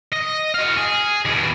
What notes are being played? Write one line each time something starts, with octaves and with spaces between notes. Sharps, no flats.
D#5
F#4 F5
G#4
D#2 B2